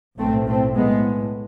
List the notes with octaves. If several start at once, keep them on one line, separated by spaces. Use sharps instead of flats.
B1 A2 A3 C4
A3 C4
A2 G#3 B3